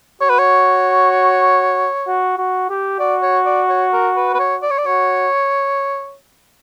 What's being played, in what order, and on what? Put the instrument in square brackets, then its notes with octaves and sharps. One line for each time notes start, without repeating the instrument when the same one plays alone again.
[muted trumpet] F#4 [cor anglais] C#5
[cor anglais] B4
C#5
[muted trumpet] F#4
F#4
G4
[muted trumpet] F#4 [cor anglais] D5
[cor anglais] C#5
D5
C#5
A#4
B4
B4
C#5
D5
C#5
D5
[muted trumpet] F#4 [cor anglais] C#5